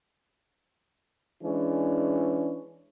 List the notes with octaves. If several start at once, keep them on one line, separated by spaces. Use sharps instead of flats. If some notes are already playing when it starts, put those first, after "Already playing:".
E3 G#3 C#4 D4